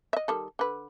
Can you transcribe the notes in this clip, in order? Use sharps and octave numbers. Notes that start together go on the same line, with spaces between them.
D#5 E5
D#3 G3 A4
D3 B4